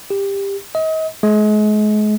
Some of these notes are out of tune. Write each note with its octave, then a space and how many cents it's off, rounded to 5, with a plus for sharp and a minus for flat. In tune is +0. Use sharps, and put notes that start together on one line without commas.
G4 +15
D#5 +35
G#3 +35